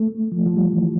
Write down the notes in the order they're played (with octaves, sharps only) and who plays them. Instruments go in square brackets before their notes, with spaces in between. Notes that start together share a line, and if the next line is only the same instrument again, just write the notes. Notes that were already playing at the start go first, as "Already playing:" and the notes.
Already playing: [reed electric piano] A3
F3
F3
G3
E3